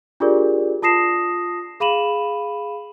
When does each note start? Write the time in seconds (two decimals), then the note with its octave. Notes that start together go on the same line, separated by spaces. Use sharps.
0.20 D4 F4 G4 G#4 A#4 D5
0.82 F4 A5 D#6 A#6 C7 E7
1.80 G#4 F5 B5 D#7 E7 F#7